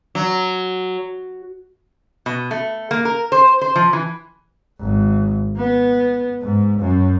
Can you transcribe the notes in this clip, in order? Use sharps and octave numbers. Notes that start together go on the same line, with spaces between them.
F#3
B2
A3
A#3
A#4
C5
C5
F3
E3
G#1
B3
G#2
F#2